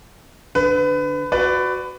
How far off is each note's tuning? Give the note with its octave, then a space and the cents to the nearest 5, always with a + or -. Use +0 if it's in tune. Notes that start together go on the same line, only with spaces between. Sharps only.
D3 +0 B4 +25
F#4 +0 B4 +20 D5 +0